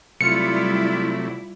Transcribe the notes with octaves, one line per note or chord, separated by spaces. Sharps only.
C3 F#3 G3 A3 E4 F4 D5 C#7